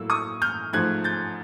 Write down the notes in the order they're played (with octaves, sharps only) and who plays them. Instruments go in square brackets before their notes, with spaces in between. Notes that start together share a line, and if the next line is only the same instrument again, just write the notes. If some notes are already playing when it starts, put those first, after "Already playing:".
Already playing: [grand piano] A2 F#3 A#3 E6
C#6 D#6
F6 G6
G#2 F3 A3 F#6 G#6
G6 A6